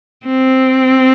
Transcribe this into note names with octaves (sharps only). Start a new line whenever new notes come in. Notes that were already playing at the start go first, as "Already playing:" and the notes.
C4